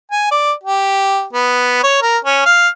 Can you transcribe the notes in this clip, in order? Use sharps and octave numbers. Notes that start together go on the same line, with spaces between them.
G#5
D5
G4
B3
C#5
A#4
C#4
F5